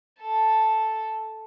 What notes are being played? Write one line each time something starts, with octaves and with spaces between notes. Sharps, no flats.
A4 A5